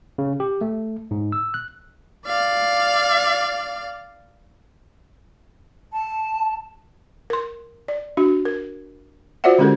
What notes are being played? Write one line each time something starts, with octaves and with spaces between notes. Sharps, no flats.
C#3
G4
A3
G#2
E6
F#6
D5 F5
A5
A#4 C6
D5
D4 F#4
A#4
F4 F#4 C5 D5 E5 F#5
D3 G#3 C#4 G4 A4 A#4